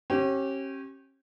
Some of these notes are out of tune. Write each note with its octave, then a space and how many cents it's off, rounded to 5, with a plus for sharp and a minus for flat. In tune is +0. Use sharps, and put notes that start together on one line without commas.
C#4 -35 G4 -25